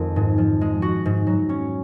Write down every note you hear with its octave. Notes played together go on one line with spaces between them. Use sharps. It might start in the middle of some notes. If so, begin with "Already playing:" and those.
Already playing: F2 D#3 G#3
G#2
F3
G#3
F#4
G#2
F#3
C#4